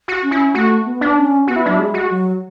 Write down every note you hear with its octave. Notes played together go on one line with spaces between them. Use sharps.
F#4
C#4
E4
A3 F#4
B3
D4
C#4
B3 F#4
E4
F#3 D4
E4
G#3
F#4
F#3